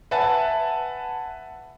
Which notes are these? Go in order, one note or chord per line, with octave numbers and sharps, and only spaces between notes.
B4 E5 F#5 G#5 A5 A6